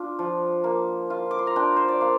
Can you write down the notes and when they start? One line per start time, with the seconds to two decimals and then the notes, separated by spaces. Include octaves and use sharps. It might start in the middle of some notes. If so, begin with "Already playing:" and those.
Already playing: D4 F4
0.19 F3
0.64 A#3
1.10 F4
1.31 D6
1.39 C6
1.47 A#5
1.56 D4 G5
1.76 C5
1.88 D5
2.01 A#3 F5